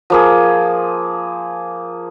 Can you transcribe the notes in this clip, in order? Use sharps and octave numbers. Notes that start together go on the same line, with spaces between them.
F3 A#3 G#4